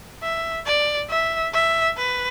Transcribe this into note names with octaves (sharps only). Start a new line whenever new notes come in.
E5
D5
E5
E5
B4